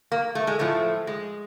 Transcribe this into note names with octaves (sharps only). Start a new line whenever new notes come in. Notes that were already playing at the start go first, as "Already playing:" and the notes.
A#3
A3
G#3
A2 F3 A3
G#3